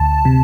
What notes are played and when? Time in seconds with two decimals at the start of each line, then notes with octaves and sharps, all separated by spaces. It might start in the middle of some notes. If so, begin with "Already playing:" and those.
Already playing: D2 A5
0.25 C3